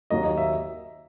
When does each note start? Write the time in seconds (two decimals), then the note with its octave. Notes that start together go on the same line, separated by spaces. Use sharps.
0.10 D#2 D#3 F#3 A#3 D#5
0.24 D#5
0.38 E5